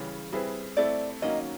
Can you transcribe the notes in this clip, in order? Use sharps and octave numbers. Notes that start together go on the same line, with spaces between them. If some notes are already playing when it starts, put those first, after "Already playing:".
Already playing: C#3 E3 G3 C#5
G3 C4 E4 G#4 B4
A3 C4 E4 D5
D#3 F#3 A#3 C#4 D#5